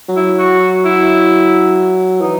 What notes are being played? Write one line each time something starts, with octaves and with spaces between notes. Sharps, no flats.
F#3
E4
F#4
E4
E3 D#4